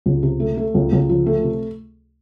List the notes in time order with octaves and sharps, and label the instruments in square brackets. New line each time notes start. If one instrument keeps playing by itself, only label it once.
[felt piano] C#2
C3
A3
A3
C#2
C#2
F3
A3
C3